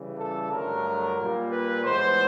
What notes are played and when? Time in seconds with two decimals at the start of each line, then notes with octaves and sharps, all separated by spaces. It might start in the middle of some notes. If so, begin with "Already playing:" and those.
Already playing: C#3 E3 G3
0.19 A4
0.51 G2 D3 F#3 A3 A#4
1.17 A#2 G3 A#3
1.51 B4
1.83 A2 E3 G#3 B3 C5